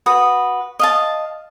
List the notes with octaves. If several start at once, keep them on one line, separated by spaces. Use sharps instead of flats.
F#4 B4 D#6
D#5 F5 A5